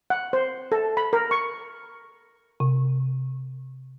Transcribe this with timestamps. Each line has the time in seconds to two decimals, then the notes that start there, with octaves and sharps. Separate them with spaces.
0.10 F#5
0.33 C5
0.72 A4
0.97 B5
1.13 A#4
1.31 C#6
2.60 C3